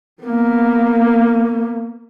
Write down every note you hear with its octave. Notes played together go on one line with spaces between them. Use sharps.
A#3 B3